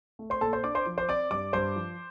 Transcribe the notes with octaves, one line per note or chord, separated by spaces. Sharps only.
A3
C5 C6
A#2 A4 A5
C5 C6
D4 D5 D6
C5 C6
F3
C5 C6
C4 D5 D6
G2 D5 D6
G2 C5 C6
F3